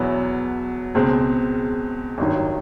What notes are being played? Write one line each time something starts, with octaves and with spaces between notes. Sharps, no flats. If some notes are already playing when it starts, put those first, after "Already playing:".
Already playing: E2 B2 F#3 B3 E4
C#2 B2 G#3 C4
G#1 G2 D#3 F#3